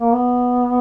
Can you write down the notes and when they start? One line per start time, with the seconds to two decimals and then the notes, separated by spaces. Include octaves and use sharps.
0.01 A#3
0.13 B3